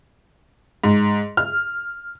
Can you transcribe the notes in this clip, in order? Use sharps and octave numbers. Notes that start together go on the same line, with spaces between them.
G#2
F6